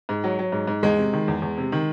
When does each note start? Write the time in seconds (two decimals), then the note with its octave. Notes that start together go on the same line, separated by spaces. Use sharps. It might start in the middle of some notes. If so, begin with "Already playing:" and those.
0.09 G#2
0.24 F#3
0.39 F#3
0.52 G#2
0.67 G#2
0.83 E2 G#3
0.97 C3
1.13 D#3
1.28 E2
1.42 E2
1.57 C3
1.72 D#3